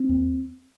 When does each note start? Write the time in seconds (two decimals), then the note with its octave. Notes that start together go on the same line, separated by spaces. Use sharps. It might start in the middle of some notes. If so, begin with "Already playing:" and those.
Already playing: C4
0.09 D#2